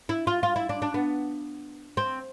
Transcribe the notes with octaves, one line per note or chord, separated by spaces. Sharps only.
E4
F4
F4
E4
D4
D4
B3
C4